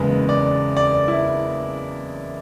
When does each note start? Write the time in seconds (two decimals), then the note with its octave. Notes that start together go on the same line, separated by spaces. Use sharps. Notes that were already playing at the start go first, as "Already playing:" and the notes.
Already playing: F#1 E2 C#3 G#3 B4
0.29 D5
0.77 D5
1.08 E4